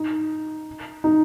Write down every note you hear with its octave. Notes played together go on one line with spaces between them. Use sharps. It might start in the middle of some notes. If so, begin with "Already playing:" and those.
Already playing: D#4
D#4